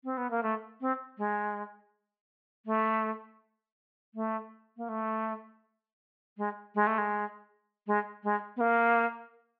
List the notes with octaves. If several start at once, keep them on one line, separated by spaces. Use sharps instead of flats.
C4
B3
A#3
A3
C4
G#3
A3
A3
A#3
A3
G#3
G#3
A3
G#3
G#3
G#3
B3
A#3